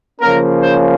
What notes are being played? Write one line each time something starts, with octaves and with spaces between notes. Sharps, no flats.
C#3 F3 A#3 C#4 A#4
C5